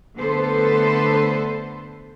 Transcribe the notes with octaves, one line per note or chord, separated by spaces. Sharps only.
D3 A3 B3 A4 B4 C5